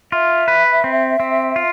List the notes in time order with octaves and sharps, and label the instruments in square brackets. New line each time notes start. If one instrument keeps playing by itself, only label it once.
[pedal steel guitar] F4 [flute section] E5
[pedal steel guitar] B4
C4
C4
F4